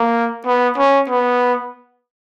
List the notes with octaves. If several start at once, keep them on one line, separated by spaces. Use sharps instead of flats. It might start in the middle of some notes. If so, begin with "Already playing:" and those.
Already playing: A#3
B3
C#4
B3